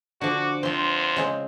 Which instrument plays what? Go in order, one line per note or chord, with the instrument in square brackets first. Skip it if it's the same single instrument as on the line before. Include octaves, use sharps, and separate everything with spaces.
[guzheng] D3 F3 [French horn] F#4 [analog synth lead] D6
[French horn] E2 [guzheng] F3 C4 [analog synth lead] C6
[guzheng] C#3 G#3 C4